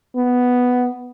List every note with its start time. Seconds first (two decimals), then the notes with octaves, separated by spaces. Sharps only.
0.16 B3